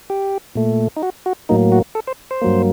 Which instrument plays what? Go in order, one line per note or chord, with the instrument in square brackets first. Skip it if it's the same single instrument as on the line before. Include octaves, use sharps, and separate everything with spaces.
[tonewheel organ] G4
A#2 A3
D#4
F#4
F#4
A2 F#3 A#3 D#4
F#4
A4
C5
C5
G2 F#3 A#3